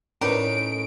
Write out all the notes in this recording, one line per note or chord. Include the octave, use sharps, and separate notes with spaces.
A2 C#4 D#4 A#4 B4 D5 D7